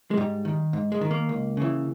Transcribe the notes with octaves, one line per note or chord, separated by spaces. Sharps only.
G#3
G#2 G3
D#3
G#2
G#3
D#3
A#3
C#2
C#3 E3